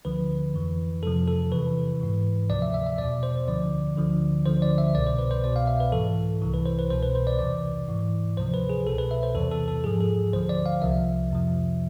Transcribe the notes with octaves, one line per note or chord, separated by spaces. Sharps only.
D2 D3 F3 B4
F2 E3
F2 C3 F3 A4
A4
E2 C3 E3 B4
G#2 E3
D2 C3 F3 D5
E5
E5
E5
E2 B2 D5
C5
D2 D3 F3 D5
D2 D3 F3
D2 D3 F3 C5
D5
E5
C2 B2 D5
C5
B4
C5
C2 B2 D5
F5
E5
B4
G#2 E3 A4
C2 C3 E3
B4
C5
B4
C2 B2 C5
B4
C5
D5
E2 C3 E3 D5
G#2 E3
D2 C3 F3 C5
B4
G#4
C2 B2 A4
B4
E5
C5
E2 C3 E3 A4
A4
A4
G#2 F3 G#4
A4
D2 D3 F3 C5
D5
F5
C2 C3 F3 E5
F2 C3 F3